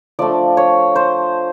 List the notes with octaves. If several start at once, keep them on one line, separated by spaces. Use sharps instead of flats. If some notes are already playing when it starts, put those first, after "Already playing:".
F3 A3 D4 D5
C#5
C5